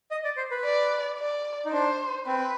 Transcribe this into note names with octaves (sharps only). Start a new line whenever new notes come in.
D#5
D5
C5
B4
D5
D5
D#4
D4 C5
C4 B4